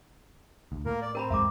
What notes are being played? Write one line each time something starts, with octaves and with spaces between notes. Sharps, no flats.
D2
A2 A#3 A#4
D5
C4 A#4 A#5 B5
E2 G#2 G#3 E5 A#5 D6